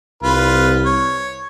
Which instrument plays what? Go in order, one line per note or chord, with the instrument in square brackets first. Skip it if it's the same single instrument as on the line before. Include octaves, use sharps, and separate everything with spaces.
[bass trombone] C2 [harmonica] F4 B4
[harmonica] C#5